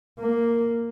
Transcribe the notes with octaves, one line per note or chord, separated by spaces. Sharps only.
A#3